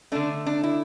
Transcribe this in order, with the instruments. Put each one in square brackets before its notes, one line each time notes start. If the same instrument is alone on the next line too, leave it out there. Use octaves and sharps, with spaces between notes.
[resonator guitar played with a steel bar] D3 A3 D4
D4
E4